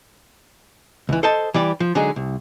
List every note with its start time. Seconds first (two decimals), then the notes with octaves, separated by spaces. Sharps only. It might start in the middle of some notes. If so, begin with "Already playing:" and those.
1.09 C#2 E3
1.23 A4 C5 D#5 A5
1.54 E3 G3 D5
1.80 F3
1.95 D3 F#3 G#3 D#4 G#4
2.16 C2